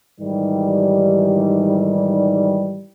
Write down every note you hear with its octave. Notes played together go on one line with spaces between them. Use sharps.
G#2 D#3 E3 G3